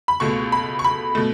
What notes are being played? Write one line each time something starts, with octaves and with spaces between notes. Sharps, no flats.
B5
C#2 B2 A3 C#6
B5
C#6
B5
B2 A3